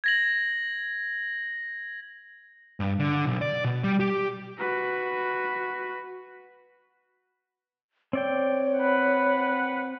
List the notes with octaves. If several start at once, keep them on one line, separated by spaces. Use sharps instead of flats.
G#6 A#6 F#7
G2
D3
B1
D5
B2
G3
G4
F#4 B4
C4 C#5 D5 G5
B4 F#5